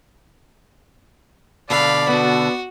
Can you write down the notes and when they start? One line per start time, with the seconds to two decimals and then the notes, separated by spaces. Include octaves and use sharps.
1.70 B2 D3 D5 F5 B5
2.09 B3 F#4